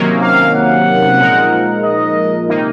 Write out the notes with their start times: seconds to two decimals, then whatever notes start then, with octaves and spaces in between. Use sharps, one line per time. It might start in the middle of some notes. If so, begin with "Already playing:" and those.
Already playing: C3 D#3 F#3 A#3 C#4
0.22 F5
0.55 F#5
1.19 A#2 F3 G#3 D#4 A#4
1.83 D#5
2.48 C3 D#3 A#3 D#4